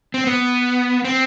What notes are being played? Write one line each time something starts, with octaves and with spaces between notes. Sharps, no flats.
C4
B3
C4